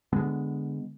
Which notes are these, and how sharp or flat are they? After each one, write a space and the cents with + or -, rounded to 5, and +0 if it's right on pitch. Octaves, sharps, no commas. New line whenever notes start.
D3 +0 G#3 -5 B3 +0